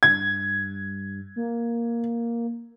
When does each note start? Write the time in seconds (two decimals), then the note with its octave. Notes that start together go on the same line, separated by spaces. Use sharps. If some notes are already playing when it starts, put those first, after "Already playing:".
0.03 G2 G#6
1.36 A#3